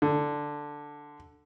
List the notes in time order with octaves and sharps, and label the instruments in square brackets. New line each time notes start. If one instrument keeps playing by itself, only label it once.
[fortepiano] D3